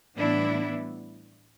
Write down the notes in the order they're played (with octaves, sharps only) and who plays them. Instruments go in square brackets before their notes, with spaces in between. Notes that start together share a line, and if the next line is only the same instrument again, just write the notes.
[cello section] A2 E3 G3 B3 D4 E4